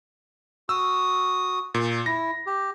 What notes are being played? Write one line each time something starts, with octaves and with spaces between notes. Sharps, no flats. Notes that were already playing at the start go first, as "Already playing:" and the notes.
F#4 D#6 E6
A#2
E4 A#6
G4